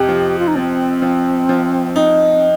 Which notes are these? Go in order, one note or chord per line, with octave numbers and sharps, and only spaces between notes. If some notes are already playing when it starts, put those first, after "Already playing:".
Already playing: F2 C3 D#4 G4
F3
F4
D#4
F3 C4
F3
F3
D#4